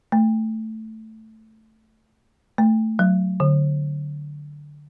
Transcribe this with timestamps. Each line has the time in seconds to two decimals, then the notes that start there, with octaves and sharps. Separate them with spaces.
0.12 A3
2.58 A3
2.99 F#3
3.40 D3